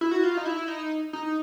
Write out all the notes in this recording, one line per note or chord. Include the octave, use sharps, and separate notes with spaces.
E4
F#4
F4
D#4
E4
D#4
D#4